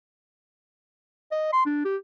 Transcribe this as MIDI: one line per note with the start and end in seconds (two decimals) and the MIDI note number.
1.32 1.51 75
1.53 1.62 84
1.66 1.81 62
1.85 1.96 67